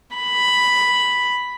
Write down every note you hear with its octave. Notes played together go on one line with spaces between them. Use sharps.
B5